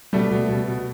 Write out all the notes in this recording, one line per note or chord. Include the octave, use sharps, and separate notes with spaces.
B2 G3 A3
B2
B2
B2